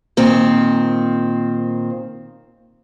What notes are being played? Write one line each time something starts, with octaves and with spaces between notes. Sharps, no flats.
A#2 D#3 C4